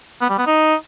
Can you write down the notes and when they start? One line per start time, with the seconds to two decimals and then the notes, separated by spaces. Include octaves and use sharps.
0.21 B3
0.29 G3
0.38 B3
0.46 D#4